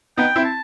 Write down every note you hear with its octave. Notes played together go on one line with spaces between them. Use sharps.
B3 D#4 G5
C4 E4
A5